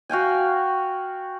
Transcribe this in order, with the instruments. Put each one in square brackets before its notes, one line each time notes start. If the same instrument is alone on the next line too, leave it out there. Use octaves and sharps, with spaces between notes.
[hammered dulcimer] F#4 F5 G5 G#5